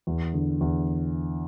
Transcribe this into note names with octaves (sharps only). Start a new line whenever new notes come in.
E2
D3
E2